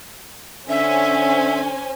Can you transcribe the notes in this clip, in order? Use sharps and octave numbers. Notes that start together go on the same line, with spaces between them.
D3 C#4 C5 E5 G#5